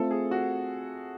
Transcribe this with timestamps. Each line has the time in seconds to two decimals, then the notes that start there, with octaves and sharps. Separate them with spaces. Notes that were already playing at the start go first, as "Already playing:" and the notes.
Already playing: A3 C4 F4 A4
0.11 G#4
0.31 F#4